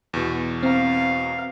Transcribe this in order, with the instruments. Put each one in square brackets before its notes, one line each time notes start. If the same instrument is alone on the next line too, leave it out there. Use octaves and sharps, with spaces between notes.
[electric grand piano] E2 B2
[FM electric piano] C4 A#5 [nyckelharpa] F5